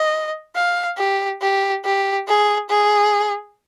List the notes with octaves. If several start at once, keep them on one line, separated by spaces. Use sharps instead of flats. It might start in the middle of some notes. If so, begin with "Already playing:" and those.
Already playing: D#5
F5
G4
G4
G4
G#4
G#4